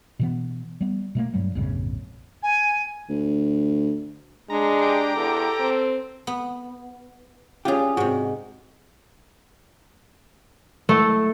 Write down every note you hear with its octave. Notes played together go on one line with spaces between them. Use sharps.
B2 E3 B3
G3 B3
B2 A3 A#3
G2 F#3 G3
A#1 F2 G#2 C#3
G#5
D2
G#3 D4 A#5
G4 A#5 D6
E2 A4
C4
B3
C#4 D4 F4 G4 G#4
G#2 C3 F#4
A3